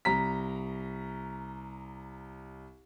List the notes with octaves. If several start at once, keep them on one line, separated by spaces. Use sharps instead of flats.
C2 A#5 B6